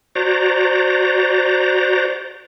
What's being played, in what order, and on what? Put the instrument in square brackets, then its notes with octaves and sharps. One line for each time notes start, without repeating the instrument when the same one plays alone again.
[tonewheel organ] F#4 C5 D5 A#5